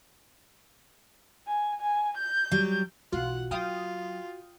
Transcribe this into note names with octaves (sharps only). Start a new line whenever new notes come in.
G#5
G#5
G6
F#3 G3
B1 E3 F4 F#4 F#5
F#3 F4 F5 G5 D#6